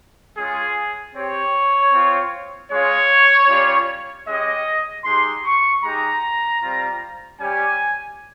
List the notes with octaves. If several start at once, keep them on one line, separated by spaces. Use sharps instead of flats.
G#3 C#4 F4 G#4
C4 G4 C#5
C4 F4
G#3 C#4 F4 C#5
G3 C#4 F4
G#3 C#4 G4 D#5
G#3 D#4 G4 C6
C#6
G#3 D#4 G4 A#5
G3 C4 F4
G3 C#4 G4 G#5